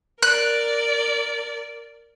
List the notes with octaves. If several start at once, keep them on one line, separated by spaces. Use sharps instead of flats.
A#4 D5 F#6